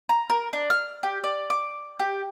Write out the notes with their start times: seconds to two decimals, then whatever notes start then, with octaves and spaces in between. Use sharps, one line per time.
0.09 A#5
0.30 A#4
0.53 D4
0.70 F6
1.03 G4
1.24 D5
1.50 D6
1.99 G4